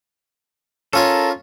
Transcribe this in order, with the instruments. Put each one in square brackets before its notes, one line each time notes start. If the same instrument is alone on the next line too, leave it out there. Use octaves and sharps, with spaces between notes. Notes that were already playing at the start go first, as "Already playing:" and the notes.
[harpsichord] C#4 F4 C#5 [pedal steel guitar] A4 A#4